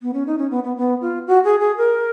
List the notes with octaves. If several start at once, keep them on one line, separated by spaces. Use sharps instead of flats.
B3
C#4
D#4
C#4
B3
B3
B3
F4
F#4
G#4
G#4
A#4